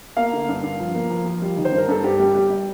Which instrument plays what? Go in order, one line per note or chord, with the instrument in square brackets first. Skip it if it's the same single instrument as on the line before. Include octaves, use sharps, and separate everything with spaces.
[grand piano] A#3 F5
D3
G2
G2
F3
A#3
F3
F3
G3
D#3
C5
G2
A#4
G2 A4
G2 G4
G3
G3
G3